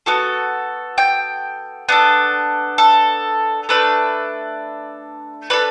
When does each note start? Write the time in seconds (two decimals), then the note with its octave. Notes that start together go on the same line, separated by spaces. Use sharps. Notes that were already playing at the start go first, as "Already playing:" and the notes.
0.06 B3 F#4 A4
0.98 G5
1.89 B3 D4 A4
2.78 A4
3.69 A3 D4 A4 B4
5.50 D4 A4 B4